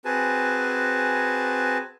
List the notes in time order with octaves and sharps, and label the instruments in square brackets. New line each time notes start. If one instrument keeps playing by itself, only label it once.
[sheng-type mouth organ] C4 F#4 G#4 B4 G#5 A5